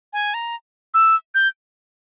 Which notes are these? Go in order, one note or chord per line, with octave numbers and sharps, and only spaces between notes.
G#5
A#5
E6
G6